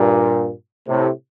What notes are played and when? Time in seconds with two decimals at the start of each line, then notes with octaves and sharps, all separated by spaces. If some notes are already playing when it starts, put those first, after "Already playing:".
Already playing: G2 A#2
0.87 A2 C3